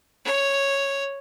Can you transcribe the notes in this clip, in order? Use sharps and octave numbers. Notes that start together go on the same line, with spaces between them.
C#5